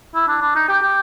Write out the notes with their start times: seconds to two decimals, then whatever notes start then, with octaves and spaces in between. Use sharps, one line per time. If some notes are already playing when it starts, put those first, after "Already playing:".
0.15 E4
0.28 D4
0.41 D4
0.55 D#4
0.69 G4
0.82 G4